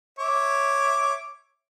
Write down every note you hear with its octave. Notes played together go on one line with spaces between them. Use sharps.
C#5 E5 D6